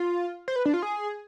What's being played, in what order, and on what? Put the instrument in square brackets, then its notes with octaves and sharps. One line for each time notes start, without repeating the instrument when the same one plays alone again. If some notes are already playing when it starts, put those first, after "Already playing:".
Already playing: [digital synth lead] F4
C5
B4
D4
F4
G#4